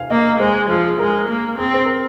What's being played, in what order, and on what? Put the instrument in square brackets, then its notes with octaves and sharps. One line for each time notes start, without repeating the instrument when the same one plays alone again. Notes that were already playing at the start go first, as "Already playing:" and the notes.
Already playing: [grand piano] F5 G#5
[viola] A#3 [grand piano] D#5
[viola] G#3 [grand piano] C5
[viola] F3 [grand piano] G#4
[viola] G#3 [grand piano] A#4
[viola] A#3
[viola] C4 [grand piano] G#4
[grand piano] C5
A#4